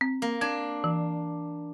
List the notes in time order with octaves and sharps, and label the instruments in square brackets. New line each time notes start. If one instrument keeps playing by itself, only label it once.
[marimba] C4
[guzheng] A#3
[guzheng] D4 [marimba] G#6
[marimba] E3